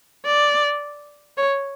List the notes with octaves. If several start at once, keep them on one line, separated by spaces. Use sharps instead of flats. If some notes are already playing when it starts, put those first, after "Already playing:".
D5
C#5